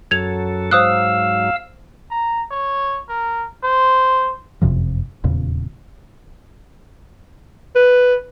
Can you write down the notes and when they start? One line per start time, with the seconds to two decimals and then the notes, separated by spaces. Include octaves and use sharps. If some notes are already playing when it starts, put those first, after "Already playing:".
0.11 F#2 F#3 A4 G#6 F7
0.71 G#2 F#3 C5 F5 D#6 E6 F#6
2.11 A#5
2.51 C#5
3.09 A#4
3.63 C5
4.62 F#1 F2 C3 F3
5.24 D#1 E2 A#2 C#3
7.75 B4